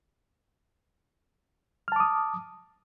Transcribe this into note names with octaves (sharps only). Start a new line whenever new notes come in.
A5 D6 D#6 F6